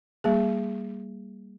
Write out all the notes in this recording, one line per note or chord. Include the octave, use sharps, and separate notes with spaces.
G3 A#3 G#4